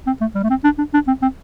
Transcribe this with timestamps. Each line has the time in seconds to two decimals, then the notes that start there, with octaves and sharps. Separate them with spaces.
0.07 C4
0.21 A3
0.35 G3
0.44 A3
0.50 C4
0.64 D4
0.78 D4
0.94 D4
1.08 C4
1.22 C4